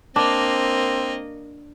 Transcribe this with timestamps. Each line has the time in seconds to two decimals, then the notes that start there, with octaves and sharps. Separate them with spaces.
0.16 A#3 C4 D4 D#5